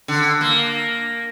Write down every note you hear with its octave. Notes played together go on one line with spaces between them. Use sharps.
D3
A#3